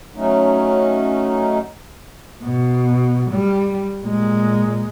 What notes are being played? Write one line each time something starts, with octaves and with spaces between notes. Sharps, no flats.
F#3 A3 C#4 D#4
B2
G3
A#2 G#3